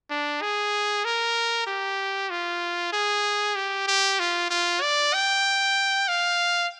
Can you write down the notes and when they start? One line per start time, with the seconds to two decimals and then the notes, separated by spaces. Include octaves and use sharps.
0.10 D4
0.41 G#4
1.04 A#4
1.67 G4
2.30 F4
2.93 G#4
3.56 G4
3.87 G4
4.19 F4
4.50 F4
4.82 D5
5.13 G5
6.08 F5